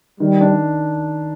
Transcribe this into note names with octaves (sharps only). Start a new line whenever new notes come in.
D#3 G3
D4